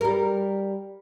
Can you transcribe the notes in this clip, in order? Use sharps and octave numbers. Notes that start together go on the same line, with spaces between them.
G3 A#4